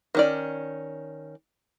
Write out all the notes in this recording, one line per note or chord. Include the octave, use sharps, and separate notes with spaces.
D#3 C#4 D5